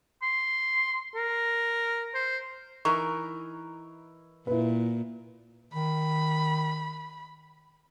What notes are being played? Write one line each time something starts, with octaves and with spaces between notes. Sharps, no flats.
C6
A#4
C5
E3 D#4 A#4 C#6
A#2 E4 B4
D#3 B5